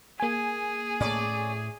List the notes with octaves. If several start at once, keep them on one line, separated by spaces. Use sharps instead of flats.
A#3 G#4 G#5
A2 A3 C#4 D5